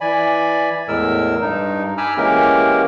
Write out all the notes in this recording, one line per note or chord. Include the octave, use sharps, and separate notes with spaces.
E3 D5 G#5 B5
E2 A2 G#3 A#4 E6
G2 D#4
G#5 A#5 B5 D6 E6 F6
E3 G#3 A#3 C#4 G4 A#4